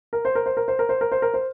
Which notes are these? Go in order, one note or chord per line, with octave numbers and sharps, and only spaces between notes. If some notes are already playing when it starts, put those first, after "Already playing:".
A#4
C5
A#4
C5
A#4
C5
A#4
C5
A#4
C5
A#4
C5